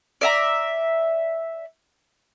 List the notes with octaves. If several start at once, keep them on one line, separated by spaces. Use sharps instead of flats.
D5 E5 A#5